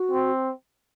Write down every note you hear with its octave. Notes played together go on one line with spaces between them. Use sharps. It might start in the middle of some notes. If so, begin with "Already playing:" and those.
Already playing: F#4
C4